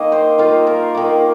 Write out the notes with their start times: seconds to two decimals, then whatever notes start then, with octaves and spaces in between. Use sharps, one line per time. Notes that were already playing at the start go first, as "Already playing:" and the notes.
Already playing: D#3 A#3 D#5
0.12 C5
0.38 D#3 A#3 F4
0.67 A#4
0.95 D#3 A#3